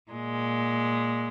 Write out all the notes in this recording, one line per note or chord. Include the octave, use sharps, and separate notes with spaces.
A#2 G#3